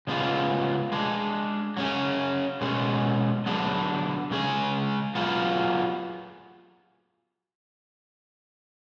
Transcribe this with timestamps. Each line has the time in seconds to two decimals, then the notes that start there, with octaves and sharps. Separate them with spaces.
0.07 C#3 G#3 B3 F4 G#4
0.92 G#3 D4 G#4
1.77 F#3 C#4 G#4
2.61 B2 G#3 C#4
3.46 D3 F#3 B3 D4 G#4
4.31 C#3 G#3 C#4 G#4
5.15 F#3 B3 F4 G#4